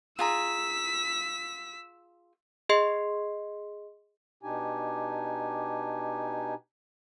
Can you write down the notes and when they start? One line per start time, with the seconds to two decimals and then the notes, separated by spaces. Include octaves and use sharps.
0.19 F4 G#4 A#5 E6 B6
2.69 G#4 D#5 C6 C7
4.43 B2 D4 D#4 G4 G#5